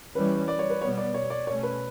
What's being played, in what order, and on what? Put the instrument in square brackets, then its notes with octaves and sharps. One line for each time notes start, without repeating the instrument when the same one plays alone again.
[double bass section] E3 G3 C#4 [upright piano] B4
[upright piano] D5
C#5
B4
[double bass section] B2 G3 B3 [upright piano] C#5
[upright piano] D5
C#5
D5
[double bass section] B2 A3 C#4 [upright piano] C#5
[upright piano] B4